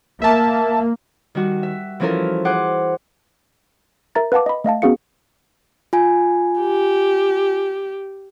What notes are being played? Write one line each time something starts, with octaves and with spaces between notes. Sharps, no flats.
A#3 E5 A5
D#3 G3 F#4
E5
E3 F3 C#4 E4 A4 A#4
G#4 C5 F#5 D6 F#6
A#4 E5 A#5 A6
B4 F5 F#5 A5 D6
D#5 B5
A3 D#5 F5 A5
B3 C#4 F#4 G#4 F5 C#7
F4 G#5
G4